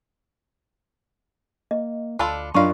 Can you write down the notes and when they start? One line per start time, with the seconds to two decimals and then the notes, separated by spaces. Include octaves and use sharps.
1.71 A#3 D#5
2.19 D2 D4 F4 A4 A5 B5 C6
2.54 F#2 F#3 D4 D#4 F4 F5 C6 C#6